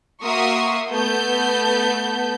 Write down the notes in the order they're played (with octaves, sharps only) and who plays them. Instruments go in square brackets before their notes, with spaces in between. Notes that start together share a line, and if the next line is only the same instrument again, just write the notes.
[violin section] A#3 F#4 E5 C6 C#6 D#6
A3 B3 A4 G6